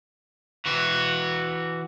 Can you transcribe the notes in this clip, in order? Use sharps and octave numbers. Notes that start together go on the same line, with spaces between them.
E3 F#4